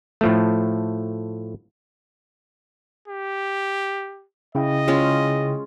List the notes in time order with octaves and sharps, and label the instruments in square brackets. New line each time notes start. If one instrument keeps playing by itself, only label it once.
[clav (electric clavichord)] A2 F3 A3
[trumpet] G4
[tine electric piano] C#3 E4 G5 [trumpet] D#5
[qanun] G#3 C#4 F4